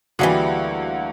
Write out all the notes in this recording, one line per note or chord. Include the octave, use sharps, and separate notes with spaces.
D2 E3 G3 A#3 F#4 G#4